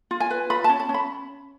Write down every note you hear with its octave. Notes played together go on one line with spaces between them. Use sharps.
F4
G#5
B4
F4 B5
A5
C#4
A5
C#4
B5